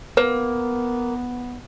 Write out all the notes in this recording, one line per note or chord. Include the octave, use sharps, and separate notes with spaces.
A#3 B3 B4